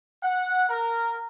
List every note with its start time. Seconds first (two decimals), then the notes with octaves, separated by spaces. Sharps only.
0.24 F#5
0.70 A#4